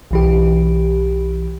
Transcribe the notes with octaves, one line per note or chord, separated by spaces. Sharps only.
B1 E3 G4